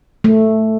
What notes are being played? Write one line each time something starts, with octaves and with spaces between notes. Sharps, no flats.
A3